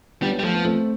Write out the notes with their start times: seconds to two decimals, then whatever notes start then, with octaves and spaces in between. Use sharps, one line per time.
0.22 G3 B3 D4
0.39 G3
0.42 F3 A3
0.55 B3
0.65 A3 C4